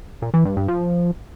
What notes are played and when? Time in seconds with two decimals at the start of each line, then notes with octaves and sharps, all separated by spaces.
0.22 A#2
0.34 E3
0.45 G2
0.57 G2
0.68 F3